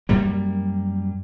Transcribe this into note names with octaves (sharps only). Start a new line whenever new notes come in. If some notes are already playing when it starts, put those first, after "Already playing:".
F#2 G3 A#3